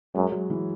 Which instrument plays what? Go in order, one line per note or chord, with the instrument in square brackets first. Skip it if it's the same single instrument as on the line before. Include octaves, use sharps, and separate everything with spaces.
[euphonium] F#2 [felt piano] G#3
[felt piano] F#3
E3